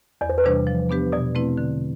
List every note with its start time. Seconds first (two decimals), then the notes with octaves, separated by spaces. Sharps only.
0.21 E2 D5
0.29 C5
0.38 B4
0.44 C3 E3 G3 D4 C5
0.67 F3
0.89 B3 D4 G4 B4
1.12 B2 D5
1.35 A3 C4 E4 B4
1.58 D3